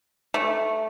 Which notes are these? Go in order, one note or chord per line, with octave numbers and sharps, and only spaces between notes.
A3